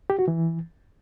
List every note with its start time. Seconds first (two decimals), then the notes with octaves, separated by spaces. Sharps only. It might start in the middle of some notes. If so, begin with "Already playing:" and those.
0.10 G4
0.19 F#4
0.28 E3